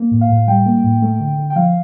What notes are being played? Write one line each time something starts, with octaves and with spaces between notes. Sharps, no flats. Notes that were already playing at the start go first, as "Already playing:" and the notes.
Already playing: A#3
A2
F5
A2
G3 G5
A#3
A2
A3
D3
D3
G5
F3 F5